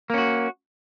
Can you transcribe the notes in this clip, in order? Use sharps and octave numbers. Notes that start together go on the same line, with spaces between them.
A#3 C#4 F#4